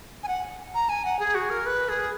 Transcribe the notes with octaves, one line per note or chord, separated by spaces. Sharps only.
G#5
F#5
A#5
G#5
F#5
G#4
F#4
A#4
B4
G#4